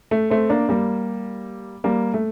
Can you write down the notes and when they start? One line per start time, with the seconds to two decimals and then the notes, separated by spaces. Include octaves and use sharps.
0.11 A3
0.30 A3 C4
0.50 A#3 D4
0.69 G3 A#3
1.84 G3 A#3
2.14 A3